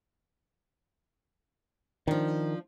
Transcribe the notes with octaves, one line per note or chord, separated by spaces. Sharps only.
D#3 F3 D4